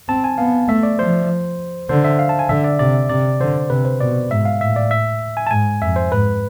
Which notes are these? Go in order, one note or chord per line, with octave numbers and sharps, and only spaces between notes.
C4 A5
G#5
B3 F5
A3 E5
D5
F3 C5
D3 C5
E5
F5
A5
G#5
D3 E5
D5
C3 D5
C3 D5
D3 C5
C3 B4
C5
B2 D5
G#2 E5
F5
A2 E5
D5
E5
G#5
A5
G#2 G#5
F2 E5
C5
G#2 B4